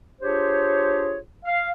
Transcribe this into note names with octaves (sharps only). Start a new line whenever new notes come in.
D4 F4 G4 G#4 C5 C#5
F5